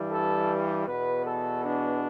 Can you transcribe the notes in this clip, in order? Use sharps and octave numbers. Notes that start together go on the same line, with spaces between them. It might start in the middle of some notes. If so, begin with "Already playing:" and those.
Already playing: G2 E3 G3
A4
E2 B2 B3 B4
A4
D4